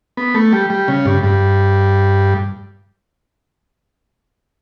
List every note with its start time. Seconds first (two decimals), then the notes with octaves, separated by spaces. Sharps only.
0.17 B3
0.34 A3
0.53 G3
0.70 G3
0.88 C#3
1.05 G2
1.23 G2